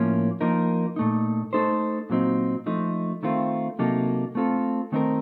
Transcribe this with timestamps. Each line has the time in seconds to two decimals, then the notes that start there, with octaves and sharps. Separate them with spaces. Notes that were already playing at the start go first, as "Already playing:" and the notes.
Already playing: A2 F3 A#3 C#4
0.41 F3 A#3 D#4 A#4
0.96 A#2 A3 D#4
1.53 A3 D#4 A4 C5
2.10 A#2 F#3 C4 D#4
2.66 F3 A3 D#4
3.23 D#3 A3 C4 F4
3.79 C3 F#3 A#3 D#4 A4
4.35 A3 C4 F4 A4
4.92 D#3 A3 C4 D#4 A#4